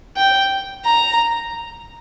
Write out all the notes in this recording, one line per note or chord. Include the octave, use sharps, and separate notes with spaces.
G5
A#5